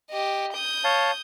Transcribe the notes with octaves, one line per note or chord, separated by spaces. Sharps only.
G4 D#5
D#6 G6
C#5 F5 A5